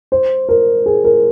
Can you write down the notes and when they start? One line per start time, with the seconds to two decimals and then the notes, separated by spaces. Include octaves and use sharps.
0.12 C5
0.49 A#4
0.86 G#4
1.04 A#4